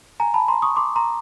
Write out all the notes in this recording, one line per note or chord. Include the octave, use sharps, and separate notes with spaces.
G#5 A#5
A5 B5
A#5 C6
C#6 D#6
C6 D6
A#5 C6